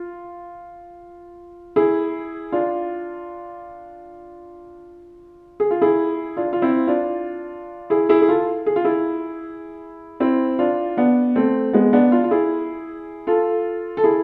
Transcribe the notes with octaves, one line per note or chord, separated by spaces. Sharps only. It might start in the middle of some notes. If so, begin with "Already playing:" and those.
Already playing: F4
E4 G#4
D4 F4
G#4
F4
E4 G#4
D4 F4
F4
C4 E4
D4 F4
E4 G#4
E4 G#4
G#4
F4 A4
G#4
F4
E4 G#4
C4 E4
D4 F4
B3 D4
A3 C4
G#3 B3
B3 D4
D4 F4
F4
E4 G#4
F4 A4
A4
E4 G#4